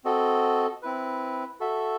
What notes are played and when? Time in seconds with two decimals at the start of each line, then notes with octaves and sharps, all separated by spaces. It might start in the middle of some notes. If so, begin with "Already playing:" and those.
0.04 C4 F#4 A4 D#5
0.82 C4 E4 B4
1.60 F#4 A4 E5